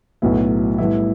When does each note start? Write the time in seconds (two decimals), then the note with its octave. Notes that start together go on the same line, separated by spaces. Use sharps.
0.22 B1 A2 F#3 B3 E4
0.78 A2 G3 B3 E4